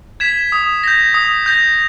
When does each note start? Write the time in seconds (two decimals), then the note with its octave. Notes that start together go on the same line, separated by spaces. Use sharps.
0.20 G#6 B6 E7
0.52 D#6
0.83 G6 A#6
1.14 D#6
1.46 G6 A#6